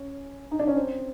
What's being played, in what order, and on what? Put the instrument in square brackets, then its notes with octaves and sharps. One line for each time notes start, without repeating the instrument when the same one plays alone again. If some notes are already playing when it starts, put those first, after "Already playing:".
Already playing: [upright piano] C#4
D#4
D4
C#4
C4